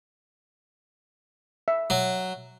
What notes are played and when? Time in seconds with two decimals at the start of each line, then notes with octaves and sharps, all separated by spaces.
1.68 E5
1.90 F#3